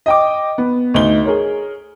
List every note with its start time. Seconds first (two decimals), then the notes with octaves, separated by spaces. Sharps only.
0.06 D#5 G5 D6
0.58 B3
0.94 D2 D#4 G7
1.25 G#4 A#4 C#5